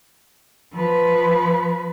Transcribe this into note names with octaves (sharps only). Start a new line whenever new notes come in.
F3 B4